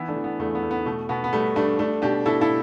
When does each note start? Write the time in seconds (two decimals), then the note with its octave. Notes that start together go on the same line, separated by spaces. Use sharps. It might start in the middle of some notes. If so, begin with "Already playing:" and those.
Already playing: E3 B3 E4
0.08 A3 D4
0.16 E3
0.24 B3
0.39 E2 A3
0.55 B3
0.62 A3
0.71 B3
0.86 B2 A3
1.09 B2 B3
1.24 B3
1.33 G3 A3
1.56 G3 A3 D4
1.79 A3 D4
2.02 B2 D4 G4
2.26 B2 E4 A4
2.41 E4 A4